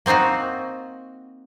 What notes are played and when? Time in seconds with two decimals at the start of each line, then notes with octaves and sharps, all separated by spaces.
0.06 A#3 C4 D#4 F4 F#4